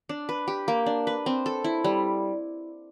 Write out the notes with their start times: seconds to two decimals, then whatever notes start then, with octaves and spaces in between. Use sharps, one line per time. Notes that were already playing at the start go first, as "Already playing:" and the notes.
0.09 D4
0.29 B4
0.48 G4
0.68 A#3
0.86 D4
1.07 B4
1.26 C4
1.46 A4
1.64 E4
1.84 G3